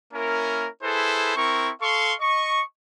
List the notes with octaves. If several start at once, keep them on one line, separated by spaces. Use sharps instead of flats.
A#3 C#4 E4 A#4
E4 G#4 A4 B4 C5
C4 E4 A#4 C#6
A4 F5 C6 C#6
D#5 C#6